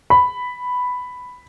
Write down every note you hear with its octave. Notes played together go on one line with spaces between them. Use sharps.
B5